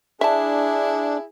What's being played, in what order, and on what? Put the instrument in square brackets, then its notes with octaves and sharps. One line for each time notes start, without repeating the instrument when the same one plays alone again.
[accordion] D4 [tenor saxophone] E4 [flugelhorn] G#4 [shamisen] E5 A5